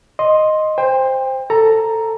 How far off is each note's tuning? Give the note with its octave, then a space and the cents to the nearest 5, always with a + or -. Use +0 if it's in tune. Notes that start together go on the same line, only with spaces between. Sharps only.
D#5 +0 C6 +10
C5 +0 G5 +30
A4 +10 A#5 +0